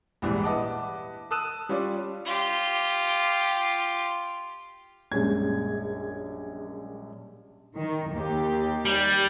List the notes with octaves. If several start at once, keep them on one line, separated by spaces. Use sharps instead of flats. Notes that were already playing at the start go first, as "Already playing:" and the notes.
A#1 E2 G#2 E3 G3
B4 D#5 E5 F#5 A5 D6
A5 D#6 E6 F#6 D#7 E7
G3 C#4 F4 C#5 D5
F4 G4
A#1 F#2 G3 G#3 C#4 G#6
D#3
D#2 G4
G3